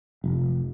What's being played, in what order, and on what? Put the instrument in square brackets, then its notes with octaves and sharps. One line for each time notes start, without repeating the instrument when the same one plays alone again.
[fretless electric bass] F1